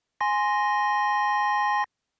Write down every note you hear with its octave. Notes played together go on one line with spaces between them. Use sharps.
G#5 C6 A#6